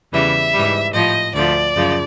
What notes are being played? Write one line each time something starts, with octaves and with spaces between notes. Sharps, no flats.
E2 C#3 E3 G3 E5
G#2 E3 G3
A2 F3 D#5
D2 D3 F3 D5
F#2 C#3 F3